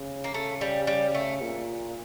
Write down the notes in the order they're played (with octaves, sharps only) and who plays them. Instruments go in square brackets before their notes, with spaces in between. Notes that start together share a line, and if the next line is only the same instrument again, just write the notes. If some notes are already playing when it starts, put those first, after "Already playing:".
Already playing: [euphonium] C#3
[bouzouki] A#3
[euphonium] C#3 [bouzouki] A3
[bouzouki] G3
G3
A3
[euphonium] A#2